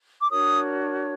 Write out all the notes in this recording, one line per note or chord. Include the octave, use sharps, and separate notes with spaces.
D6
D4 F#4 A#4 C#5 D#6